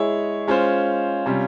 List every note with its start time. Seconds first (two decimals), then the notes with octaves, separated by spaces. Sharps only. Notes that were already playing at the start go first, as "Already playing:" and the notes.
Already playing: G#3 E4 G#4 C#5 E5
0.47 G#3 C#4 F4 C5
1.26 C3 G3 C#4 F4